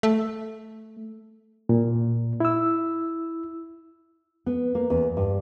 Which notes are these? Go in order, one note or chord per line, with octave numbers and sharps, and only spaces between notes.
A3
A#2
E4 E6
B3
A#3
E2
G2